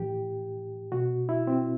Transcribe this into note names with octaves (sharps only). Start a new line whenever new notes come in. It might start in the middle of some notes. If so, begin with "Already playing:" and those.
Already playing: A2 E3 G4
B2 F#4
E4
C4